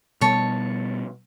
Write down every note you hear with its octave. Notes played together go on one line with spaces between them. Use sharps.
B2 G3 B3 C#5 A5